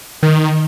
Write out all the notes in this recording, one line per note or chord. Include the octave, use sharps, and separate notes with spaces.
D#3